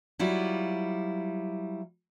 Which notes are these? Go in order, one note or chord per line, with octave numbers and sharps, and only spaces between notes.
F#3 G3 E4 F4